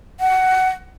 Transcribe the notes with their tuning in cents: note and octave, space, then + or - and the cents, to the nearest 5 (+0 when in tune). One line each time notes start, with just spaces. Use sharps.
F#5 +15